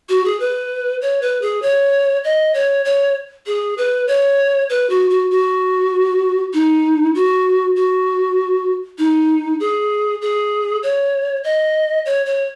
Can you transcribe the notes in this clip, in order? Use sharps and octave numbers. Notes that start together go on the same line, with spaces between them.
F#4
G#4
B4
C#5
B4
G#4
C#5
D#5
C#5
C#5
G#4
B4
C#5
B4
F#4
F#4
F#4
D#4
F#4
F#4
D#4
G#4
G#4
C#5
D#5
C#5
C#5